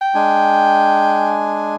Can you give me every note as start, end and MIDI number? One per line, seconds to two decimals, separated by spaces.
0.01 1.36 79
0.15 1.76 56
0.15 1.76 62
0.15 1.76 80